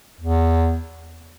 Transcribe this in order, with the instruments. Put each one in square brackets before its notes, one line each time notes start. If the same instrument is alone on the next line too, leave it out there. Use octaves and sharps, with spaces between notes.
[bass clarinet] E2